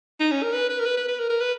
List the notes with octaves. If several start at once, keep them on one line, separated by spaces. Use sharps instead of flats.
D#4
C#4
A#4
B4
B4
A#4
B4
B4
B4
A#4
A#4
B4